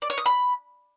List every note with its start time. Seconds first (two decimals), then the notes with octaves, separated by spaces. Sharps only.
0.02 D5
0.10 C#5
0.18 D#6
0.26 B5